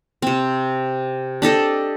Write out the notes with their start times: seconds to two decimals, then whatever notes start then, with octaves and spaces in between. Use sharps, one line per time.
0.22 C3 C4
1.42 D4 G4 A4 D#5